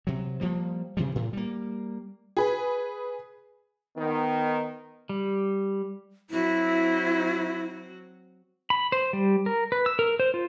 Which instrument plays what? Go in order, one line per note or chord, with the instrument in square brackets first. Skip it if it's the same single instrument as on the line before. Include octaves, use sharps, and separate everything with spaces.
[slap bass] C3 F#3
F3 G3 A#3
C3 E3 F3 G3
A2
G3 A#3
[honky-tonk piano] G#4 B4
[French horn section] D#3 B3
[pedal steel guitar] G3
[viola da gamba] F#3 C4 F#4 [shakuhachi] E4
[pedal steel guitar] B5
C5
G3
A#4
B4
E6
A#4
C5
F4